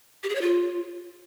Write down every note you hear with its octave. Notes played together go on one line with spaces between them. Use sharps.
G4
G#4
C#5
F4